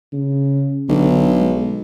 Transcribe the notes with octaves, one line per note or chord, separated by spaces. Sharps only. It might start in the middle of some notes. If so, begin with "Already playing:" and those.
C#3
B1 D3
G#3